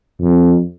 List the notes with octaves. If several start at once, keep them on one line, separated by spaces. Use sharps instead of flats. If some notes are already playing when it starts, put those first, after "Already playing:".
F2